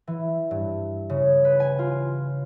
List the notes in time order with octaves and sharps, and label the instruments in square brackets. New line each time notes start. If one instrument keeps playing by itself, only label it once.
[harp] E3
G2
C#3
B4
G#5
F4